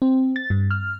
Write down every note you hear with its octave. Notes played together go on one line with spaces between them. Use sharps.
C4
A6
G2
F6